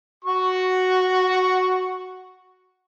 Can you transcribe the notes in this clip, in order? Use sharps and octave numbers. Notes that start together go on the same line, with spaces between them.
F#4 C#6